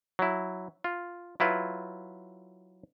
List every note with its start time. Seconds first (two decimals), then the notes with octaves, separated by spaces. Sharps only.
0.19 F#3 E4
0.84 F4
1.40 F#3 E4 F4 B4